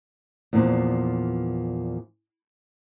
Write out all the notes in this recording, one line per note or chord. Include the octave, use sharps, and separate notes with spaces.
E2 A#2 F3